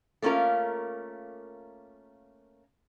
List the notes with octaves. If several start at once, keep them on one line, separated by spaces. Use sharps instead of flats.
A3 A#3 C#4 F4 A#4